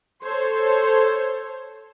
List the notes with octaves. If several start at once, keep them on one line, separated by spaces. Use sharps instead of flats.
A4 C5 C#5